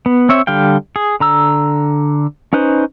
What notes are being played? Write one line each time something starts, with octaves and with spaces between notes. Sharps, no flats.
B3
C4 C#5 E5
D3 G3 F5 G5
G#4
D3 A#5 E6
C#4 D#4 B4 C5